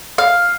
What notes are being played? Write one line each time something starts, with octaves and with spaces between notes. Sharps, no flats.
F5